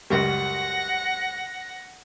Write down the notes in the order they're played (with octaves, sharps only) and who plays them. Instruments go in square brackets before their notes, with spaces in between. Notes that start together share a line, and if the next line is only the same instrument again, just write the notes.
[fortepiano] C#2 F#2 G3 [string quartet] F#5 A#6